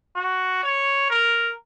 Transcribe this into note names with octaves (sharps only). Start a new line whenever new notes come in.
F#4
C#5
A#4